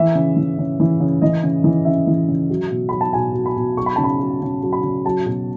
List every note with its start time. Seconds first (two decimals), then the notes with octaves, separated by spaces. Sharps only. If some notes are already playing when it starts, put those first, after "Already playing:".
Already playing: E3 E5
0.15 C#3
0.37 E3
0.58 C#3
0.80 E3
1.00 C#3
1.22 E3 D#5
1.43 C#3
1.64 E3
1.85 C#3 E5
2.07 E3
2.28 C#3
2.50 F#3
2.70 B2
2.89 F#3 B5
3.01 A5
3.13 B2 G#5
3.35 F#3
3.46 B5
3.57 B2
3.77 F#3 C#6
3.86 B5
3.96 C#3 A5
4.04 B5
4.20 F#3
4.42 C#3
4.63 F#3
4.73 B5
4.83 C#3
5.06 F#3 A5
5.26 B2